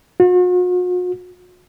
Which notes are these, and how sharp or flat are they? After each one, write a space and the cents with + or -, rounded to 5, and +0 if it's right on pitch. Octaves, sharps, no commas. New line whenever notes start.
F#4 -45